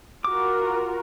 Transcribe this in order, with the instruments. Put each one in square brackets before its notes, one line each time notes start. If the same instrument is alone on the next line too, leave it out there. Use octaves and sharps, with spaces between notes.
[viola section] F4 F#4 A#4 [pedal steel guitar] D6